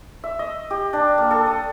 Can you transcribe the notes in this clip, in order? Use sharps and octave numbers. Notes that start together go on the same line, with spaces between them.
E5
D#5
G4
D4
A#3
A4
D#6